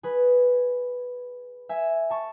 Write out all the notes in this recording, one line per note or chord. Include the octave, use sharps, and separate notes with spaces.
G#4 B4
E5 G#5
A5 C#6